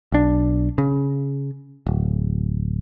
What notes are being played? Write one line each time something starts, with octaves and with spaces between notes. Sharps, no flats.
B1 D4
C#3
D1